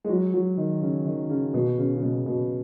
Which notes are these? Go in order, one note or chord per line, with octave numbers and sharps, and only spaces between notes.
G#3
F#3
F#3
D#3
C#3
D#3
C#3
B2
C#3
C#3
B2
B2